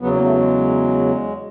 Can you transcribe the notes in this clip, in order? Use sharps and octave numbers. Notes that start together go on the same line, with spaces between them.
E2 C#3 F#3 B3
A#3
A3
G#3